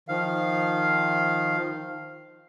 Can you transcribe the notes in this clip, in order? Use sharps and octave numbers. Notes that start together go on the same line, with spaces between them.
D#3 F3 F5